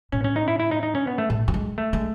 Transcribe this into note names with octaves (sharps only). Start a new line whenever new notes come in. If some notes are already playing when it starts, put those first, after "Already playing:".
A2 C#4
C#4
D#4
E4
E4
D#4
D#4
C#4
B3
A3
A2
F#3
G#3
A3
G#3